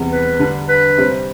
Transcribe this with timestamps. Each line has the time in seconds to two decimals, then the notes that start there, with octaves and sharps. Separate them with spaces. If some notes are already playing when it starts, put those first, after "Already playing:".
Already playing: E2 C3 G3
0.10 B4
0.39 D3 G3 D4
0.69 B4
0.98 C3 G3 C4